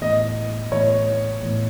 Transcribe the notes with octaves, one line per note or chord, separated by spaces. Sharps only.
A2 E3 B3 D#5
A2 E3 B3 C#5
A2 E3 B3